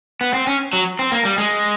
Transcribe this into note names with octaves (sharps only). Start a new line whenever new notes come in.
B3
C4
C#4
F#3
C4
A#3
G3
G#3